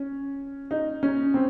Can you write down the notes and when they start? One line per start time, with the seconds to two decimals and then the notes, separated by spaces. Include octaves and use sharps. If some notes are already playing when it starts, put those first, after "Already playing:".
Already playing: C#4
0.71 D#4
1.03 C#4
1.34 C4